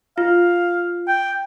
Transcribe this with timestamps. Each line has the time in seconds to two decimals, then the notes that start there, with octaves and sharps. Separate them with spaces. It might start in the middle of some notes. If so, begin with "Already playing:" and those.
0.18 F4 F5
1.08 G5